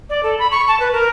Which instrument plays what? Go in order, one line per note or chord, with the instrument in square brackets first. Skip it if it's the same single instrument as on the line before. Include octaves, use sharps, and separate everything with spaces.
[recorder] D5
A4
B5
C#6
A5
B4
A#4